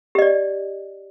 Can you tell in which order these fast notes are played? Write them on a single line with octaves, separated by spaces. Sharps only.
G4 D#5 D5